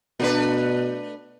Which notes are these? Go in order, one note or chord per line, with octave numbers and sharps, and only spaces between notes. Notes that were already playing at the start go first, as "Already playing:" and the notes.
B2 A3 D4 B4